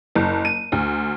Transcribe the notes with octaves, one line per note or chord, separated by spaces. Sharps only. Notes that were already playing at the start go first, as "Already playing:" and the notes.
F#1
D#7
D2